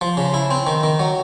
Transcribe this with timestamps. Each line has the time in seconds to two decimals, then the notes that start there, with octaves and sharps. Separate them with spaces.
0.01 F3
0.17 C#3
0.34 E4
0.51 C4
0.67 D#3
0.83 D#3
0.99 F#3